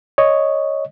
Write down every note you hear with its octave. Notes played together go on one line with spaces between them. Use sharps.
C#5 D#5